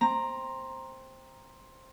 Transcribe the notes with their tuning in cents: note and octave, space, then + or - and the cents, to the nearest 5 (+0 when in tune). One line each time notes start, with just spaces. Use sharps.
C4 +10 A#5 +0